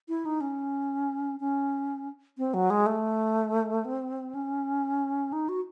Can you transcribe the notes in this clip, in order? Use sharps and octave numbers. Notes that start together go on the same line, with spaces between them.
E4
D#4
C#4
C#4
C4
F#3
G#3
A3
C4
C#4
D#4
F#4